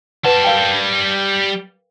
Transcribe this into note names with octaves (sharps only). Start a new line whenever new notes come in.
G3 B4 F#5 A5
A#4 F5 G5